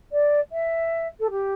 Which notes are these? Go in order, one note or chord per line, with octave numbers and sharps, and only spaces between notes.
D5
E5
A4
G4